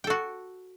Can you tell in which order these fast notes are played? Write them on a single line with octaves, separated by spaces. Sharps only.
G5 A4 F#4